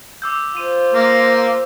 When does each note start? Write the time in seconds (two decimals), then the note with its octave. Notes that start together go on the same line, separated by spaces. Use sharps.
0.22 D6 E6 G6
0.57 F4 C5 D#7
0.93 A#3